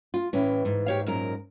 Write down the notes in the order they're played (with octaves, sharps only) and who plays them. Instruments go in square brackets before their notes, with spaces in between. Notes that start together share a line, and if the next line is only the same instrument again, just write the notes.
[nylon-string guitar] F4
[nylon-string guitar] A2 C#4 [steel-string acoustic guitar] E3
[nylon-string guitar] G#2
[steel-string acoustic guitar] G4 C#5 F5
F#2 A#2 A#4